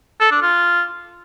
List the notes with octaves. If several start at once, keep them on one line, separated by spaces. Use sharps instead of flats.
A4
D4
F4